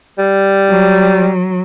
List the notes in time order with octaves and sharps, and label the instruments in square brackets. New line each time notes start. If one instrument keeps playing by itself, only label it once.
[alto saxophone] G3
[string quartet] F#3